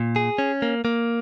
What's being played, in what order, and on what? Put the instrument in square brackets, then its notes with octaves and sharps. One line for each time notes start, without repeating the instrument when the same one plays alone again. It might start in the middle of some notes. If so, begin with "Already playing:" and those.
Already playing: [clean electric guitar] A#2
G#4
C#4
A#3
A#3